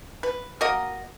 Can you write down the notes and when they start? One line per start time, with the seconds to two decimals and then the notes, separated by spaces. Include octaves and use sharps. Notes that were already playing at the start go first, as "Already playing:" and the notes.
0.23 B4
0.61 A#3 F#4 A#4 D#5